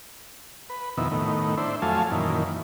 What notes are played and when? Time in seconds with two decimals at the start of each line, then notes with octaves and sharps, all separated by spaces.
0.70 B4
0.97 F2 B2 D#3 E4
1.12 A2 D#3 B3
1.57 D4 E4 C5
1.82 F2 F#3 A3 F5 G#5 A5
2.11 F#2 A#2 D#3 E3